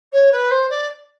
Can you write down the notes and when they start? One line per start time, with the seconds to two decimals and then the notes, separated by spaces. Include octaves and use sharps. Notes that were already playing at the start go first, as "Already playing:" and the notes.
0.12 C#5
0.32 B4
0.50 C5
0.70 D5